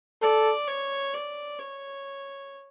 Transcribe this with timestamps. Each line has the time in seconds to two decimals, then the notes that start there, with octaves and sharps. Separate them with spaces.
0.22 A4 D5
0.68 C#5
1.14 D5
1.59 C#5